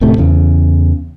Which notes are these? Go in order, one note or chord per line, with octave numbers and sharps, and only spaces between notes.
D#1 A2 C3 A3
E2 C#3